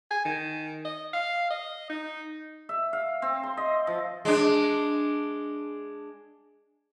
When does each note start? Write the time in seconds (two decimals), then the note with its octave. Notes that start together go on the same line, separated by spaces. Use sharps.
0.11 G#5
0.25 D#3
0.85 D#5
1.14 F5
1.50 D#5
1.90 D#4
2.69 E5
2.93 F5
3.22 C4
3.43 C6
3.57 D#5
3.87 F3
4.25 G#3 D4